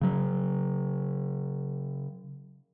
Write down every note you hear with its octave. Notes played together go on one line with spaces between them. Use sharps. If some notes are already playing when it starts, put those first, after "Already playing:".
C#3 F#3